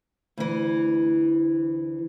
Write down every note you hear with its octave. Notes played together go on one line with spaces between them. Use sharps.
D2 E3